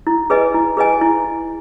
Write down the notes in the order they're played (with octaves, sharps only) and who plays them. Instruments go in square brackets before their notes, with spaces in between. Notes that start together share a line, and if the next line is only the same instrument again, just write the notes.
[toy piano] E4
G#4 B4 D#5 G#5
E4
G#4 B4 D#5 G#5
E4